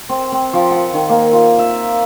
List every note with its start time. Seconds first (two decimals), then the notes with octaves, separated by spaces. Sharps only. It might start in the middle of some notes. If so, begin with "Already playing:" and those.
0.09 C4
0.32 C4
0.53 F3
0.71 F#5
0.93 D#3
1.09 A#3
1.33 F4
1.59 E5